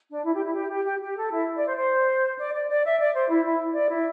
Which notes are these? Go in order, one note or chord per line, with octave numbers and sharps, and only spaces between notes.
D4
E4
G4
E4
G4
G4
G4
G4
A4
E4
D5
C5
C5
D5
D5
D5
E5
D5
C5
E4
E4
D5
E4